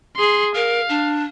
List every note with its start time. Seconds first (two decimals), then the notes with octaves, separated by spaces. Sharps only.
0.16 G#4 C6
0.55 A#4 F5
0.89 D4